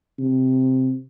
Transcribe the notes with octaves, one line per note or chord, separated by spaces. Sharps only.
C3